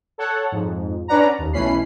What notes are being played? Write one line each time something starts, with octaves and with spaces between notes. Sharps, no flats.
A4 C#5 F#5
F2 G#2
C#4 D4 B4 D5 F#5 A#5
D#2
B1 E3 A3 C#4 B5 C7